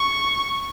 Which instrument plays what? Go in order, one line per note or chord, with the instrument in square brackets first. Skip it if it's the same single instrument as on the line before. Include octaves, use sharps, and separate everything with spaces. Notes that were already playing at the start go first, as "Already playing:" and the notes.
Already playing: [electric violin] C#6